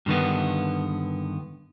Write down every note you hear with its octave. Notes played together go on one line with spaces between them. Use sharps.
G2 D3 D#3 B3